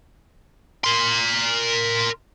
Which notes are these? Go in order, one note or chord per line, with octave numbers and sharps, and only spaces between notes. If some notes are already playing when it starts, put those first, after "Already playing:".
A#4 C6